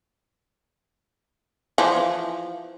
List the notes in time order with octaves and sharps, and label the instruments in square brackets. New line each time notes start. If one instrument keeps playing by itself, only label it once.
[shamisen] E3 F3